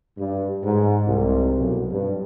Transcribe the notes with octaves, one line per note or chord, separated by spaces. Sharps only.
G2
G#2
C2
B1
G2